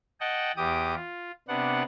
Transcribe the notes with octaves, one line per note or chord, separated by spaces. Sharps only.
D#5 F#5 G5 A5
E2 G4 D6 D#6
F4
C3 B3 D4 F#5